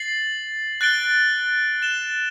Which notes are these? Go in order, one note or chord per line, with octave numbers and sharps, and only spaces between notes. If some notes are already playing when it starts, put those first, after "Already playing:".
Already playing: A6 C7 F#7
F#6 A6 D7 G7
A6 E7 G7